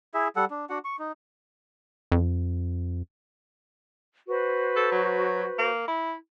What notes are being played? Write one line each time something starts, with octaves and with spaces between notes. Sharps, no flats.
E4 G#4 E5
G3 A4 F#5
D4
D4 F#4 F#5
C#6
D#4
F2
F#4 B4 C5
A4
F#3
A#3
E4